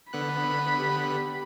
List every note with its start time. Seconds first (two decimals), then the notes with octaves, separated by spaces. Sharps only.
0.13 D3 B3 B5 F#6
0.77 G4